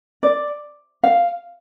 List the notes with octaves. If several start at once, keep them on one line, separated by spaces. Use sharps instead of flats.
D5
F5